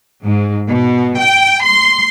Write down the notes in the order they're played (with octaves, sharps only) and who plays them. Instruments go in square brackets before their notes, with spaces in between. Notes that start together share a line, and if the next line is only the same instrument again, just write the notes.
[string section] G#2
B2
G5
C6